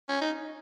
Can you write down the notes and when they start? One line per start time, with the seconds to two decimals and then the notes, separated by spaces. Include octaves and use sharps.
0.09 C#4
0.21 D#4